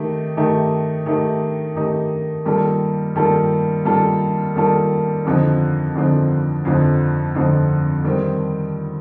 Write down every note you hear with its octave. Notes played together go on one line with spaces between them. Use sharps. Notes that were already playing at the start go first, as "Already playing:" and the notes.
Already playing: D#3 A3 D#4 G4
D#3 A3 D#4 G4
D#3 A3 D#4 G4
D#3 A3 D#4 G4
D#3 G3 A#3 F4 A4
D#3 G3 A#3 F4 A4
D#3 G3 A#3 F4 A4
D#3 G3 A#3 F4 A4
F2 D3 F3 C4 D#4
F2 D3 F3 C4 D#4
F2 D3 F3 C4 D#4
F2 D3 F3 C4 D#4
D#3 G3 C4